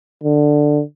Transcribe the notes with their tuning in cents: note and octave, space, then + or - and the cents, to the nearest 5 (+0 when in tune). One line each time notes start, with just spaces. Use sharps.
D3 +10